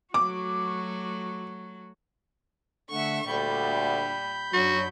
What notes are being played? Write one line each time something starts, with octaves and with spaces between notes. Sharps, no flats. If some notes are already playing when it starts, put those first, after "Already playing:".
F#3 A3 F#4 D6
D3 A3 E5 F#5 C#6
D2 A#2 D3 G3 B5 G6
F#2 F#3 D4 F#4 C#5